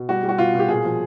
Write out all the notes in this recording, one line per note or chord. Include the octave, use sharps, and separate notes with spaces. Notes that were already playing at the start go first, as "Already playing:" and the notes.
Already playing: B2
G3 F#4
G3
F#4
B2 F4
B2
G4
A#2 G#4
F3